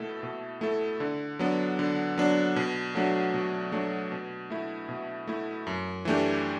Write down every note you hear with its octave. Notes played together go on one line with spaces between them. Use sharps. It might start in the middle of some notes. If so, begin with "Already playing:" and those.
Already playing: B2 A3 E4 A4
B2
A3 E4 A4
D3
F#3 B3 D4
D3
F#3 B3 D4
B2
F#3 A3 D4 F#4
B2
F#3 A3 D4 F#4
B2
A3 E4
B2
A3 E4
F#2
E3 A3 D4 G4